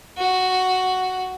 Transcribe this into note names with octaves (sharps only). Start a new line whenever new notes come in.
F#4